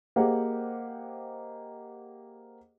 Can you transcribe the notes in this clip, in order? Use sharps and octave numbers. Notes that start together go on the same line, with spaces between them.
A#3 G4 G#4 C5 D#5 F#5